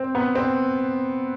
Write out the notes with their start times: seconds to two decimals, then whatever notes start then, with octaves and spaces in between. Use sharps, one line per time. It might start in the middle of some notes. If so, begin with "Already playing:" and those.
Already playing: C4
0.15 B3
0.35 C4